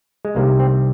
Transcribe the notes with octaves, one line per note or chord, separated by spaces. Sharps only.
G#3
C2 C3 D#3 G3 A#3
C4